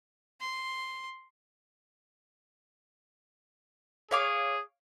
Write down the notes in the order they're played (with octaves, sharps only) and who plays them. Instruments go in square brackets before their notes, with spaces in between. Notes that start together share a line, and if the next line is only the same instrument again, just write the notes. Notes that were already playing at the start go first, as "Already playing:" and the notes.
[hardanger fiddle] C6
[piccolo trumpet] G#4 [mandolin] C#5 F5 D6